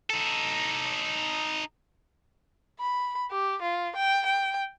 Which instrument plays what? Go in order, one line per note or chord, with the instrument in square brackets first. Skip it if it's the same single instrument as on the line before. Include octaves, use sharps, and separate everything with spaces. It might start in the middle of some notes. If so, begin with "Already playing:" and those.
[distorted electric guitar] D#4 A4
[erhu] B5
G4
F4
G5
G5